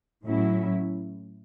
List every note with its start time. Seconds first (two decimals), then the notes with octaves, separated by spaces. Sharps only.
0.25 A2 F#3 C#4 E4